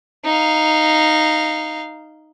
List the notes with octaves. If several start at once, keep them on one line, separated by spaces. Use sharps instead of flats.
D#4 F5